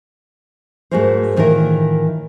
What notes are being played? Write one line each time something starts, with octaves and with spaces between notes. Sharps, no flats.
G#2 A3 F#4 G#4 A#4 C5
A2 D#3 E3 F4 A#4